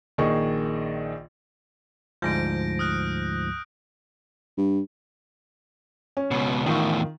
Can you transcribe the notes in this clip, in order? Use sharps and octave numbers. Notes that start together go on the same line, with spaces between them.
A#1 D#3 G#4 D#5 C#6
D2 G#2 F3 G6 A#6 D7
D#6 F6 F#6
G2
C#4
C#2 B2
E2 A2 D#3 F4 C#6